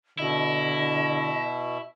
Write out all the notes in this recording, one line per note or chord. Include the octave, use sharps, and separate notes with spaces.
B2 D3 E4 D#5